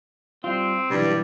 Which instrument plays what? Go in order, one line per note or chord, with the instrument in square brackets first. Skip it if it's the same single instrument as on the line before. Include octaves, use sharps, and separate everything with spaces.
[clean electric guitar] G3 F4 [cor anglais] C4
[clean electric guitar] B1 E3 [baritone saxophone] G2 [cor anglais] G3